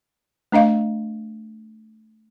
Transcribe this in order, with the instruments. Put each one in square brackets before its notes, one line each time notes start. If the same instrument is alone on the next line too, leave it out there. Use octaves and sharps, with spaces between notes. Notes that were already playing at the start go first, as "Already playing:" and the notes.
[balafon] A3 D4 D#5 F5